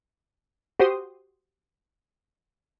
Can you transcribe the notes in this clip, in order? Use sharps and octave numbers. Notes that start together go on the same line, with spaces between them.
F#4 G4 C5 C6 D#6